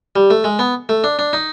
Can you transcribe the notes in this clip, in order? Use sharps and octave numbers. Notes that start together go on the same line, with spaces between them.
G3
A3
G#3
B3
A3
D4
D4
D#4